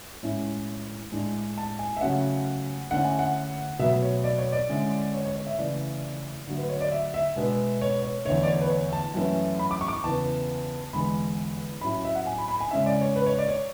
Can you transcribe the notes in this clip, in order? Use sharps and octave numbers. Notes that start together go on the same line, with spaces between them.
A2 G#3 C#4 E4
A2 G#3 D4
A5
G#5
E5
C#3 F#3 A3 C#4 F#5
D3 A3 C#4 E4 F#5
G#5
F#5
B2 F#3 A3 E5
C#5
D5
C#5
D5
D3 G#3 C#4 E4
C#5
C#5
C#5
E5
C#3 E3 A3 E4 D5
D3 F#3 A3
B4
C#5
D5
E5
E5
B2 G#3 B3 D4
C#5
C#5
E2 D3 A3 C#5
D5
C#5
B4
C#5
A5
F#2 E3 A3 C#4 E4
B5
D6
C#6
D6
C#6
E2 C#3 E3 B3 A5
E2 D3 G#3 B5
A2 F#3 C#4 E4 B5
E5
F#5
G#5
B5
B5
G#5
C#3 G#3 C#4 E4 E5
D5
C#5
B4
C#5
D5
C#5